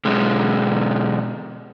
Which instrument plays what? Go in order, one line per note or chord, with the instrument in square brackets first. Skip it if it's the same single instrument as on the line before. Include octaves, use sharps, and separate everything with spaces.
[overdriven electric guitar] B1 G#3